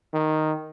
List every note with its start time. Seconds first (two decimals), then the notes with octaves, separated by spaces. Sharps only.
0.14 D#3